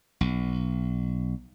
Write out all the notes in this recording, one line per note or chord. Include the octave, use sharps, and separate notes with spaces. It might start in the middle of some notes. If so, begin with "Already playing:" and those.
B1